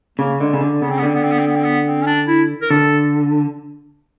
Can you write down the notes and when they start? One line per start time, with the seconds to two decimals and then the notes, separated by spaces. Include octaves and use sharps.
0.18 C#3 A#3
0.40 D3 G#3
0.53 C#3
0.61 D3
0.81 C#3 B3
0.90 C4
0.98 B3
1.02 D3 C4
1.15 B3
1.23 C4
1.31 B3
1.39 C4
1.48 B3
1.56 C4
1.64 B3
1.87 C4
2.02 C#4
2.07 D4
2.28 E4
2.62 A#4
2.70 D3 A4